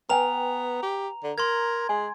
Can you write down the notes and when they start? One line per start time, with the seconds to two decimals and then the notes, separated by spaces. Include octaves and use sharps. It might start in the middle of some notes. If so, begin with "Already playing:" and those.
0.09 B3 B4 G5 G#5 A#5 F7
0.83 G4
1.23 D3
1.38 A#4 C6 G#6
1.89 G#3 G#5